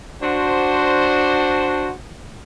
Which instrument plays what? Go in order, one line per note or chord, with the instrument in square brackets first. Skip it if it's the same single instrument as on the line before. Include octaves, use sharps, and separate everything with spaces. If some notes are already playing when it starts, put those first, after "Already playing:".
[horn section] D4 F#4 C5